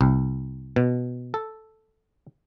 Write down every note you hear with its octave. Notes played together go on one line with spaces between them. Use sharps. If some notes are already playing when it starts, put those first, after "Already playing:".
C2
B2
A4